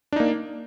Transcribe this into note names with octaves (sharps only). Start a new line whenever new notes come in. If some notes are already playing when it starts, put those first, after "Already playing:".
A#3 D4 D#4